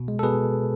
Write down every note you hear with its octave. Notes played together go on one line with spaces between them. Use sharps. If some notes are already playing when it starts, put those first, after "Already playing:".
Already playing: B2
G#3
A4
B2 G#4 B4